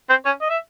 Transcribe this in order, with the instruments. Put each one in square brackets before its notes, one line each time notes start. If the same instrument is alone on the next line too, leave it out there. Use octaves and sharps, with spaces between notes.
[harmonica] C4 C5
C#4 C#5
D#5
E5